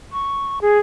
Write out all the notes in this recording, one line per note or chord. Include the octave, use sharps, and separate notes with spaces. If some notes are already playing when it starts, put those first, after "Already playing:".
C#6
G#4